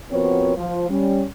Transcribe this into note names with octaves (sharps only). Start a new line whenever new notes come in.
F3 B3 C4 F#4 A#4 C#5
F3
G3 C#4